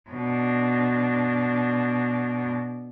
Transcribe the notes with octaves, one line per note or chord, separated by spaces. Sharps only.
B2 D4